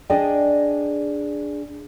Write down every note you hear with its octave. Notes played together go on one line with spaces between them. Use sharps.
D4 G#4 D5 D#5 G5